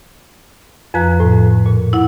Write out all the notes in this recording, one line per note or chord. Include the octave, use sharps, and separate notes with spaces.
F2 F3 B4 A#5 F#6
A2
A#2
E4 F#5